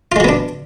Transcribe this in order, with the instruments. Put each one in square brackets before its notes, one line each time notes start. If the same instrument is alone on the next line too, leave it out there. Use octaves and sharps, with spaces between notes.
[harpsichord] F4
G#3
F#3
B3
D4